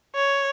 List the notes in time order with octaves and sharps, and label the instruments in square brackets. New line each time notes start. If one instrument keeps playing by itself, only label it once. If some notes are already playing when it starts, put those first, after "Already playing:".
[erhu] C#5